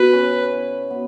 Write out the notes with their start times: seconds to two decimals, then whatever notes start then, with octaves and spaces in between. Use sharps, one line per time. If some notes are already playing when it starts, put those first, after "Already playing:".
Already playing: B2 B4
0.13 C#4
0.53 E4
0.91 B3